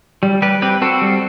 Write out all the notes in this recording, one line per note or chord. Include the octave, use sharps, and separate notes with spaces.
G3
G3 G4 B4
C4 G4 B4
C4 F#4 A4
G3